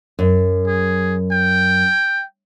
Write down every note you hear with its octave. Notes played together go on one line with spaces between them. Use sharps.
F#2
G#4
G5